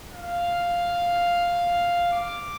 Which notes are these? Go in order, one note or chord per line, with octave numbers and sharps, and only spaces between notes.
F5
D6